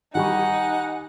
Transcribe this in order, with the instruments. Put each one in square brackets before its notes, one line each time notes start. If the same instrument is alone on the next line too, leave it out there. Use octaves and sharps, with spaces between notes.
[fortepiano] D#3 G3 C#6 [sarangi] D#4 [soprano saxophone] F#5 [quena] G#5